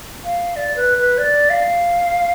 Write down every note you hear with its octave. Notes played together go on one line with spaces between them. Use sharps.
F5
D5
B4
B4
D5
F5